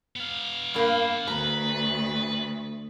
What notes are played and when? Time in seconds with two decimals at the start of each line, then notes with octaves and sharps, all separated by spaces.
0.16 B3 F5
0.74 G2 A#3
1.27 D2 B4 A#5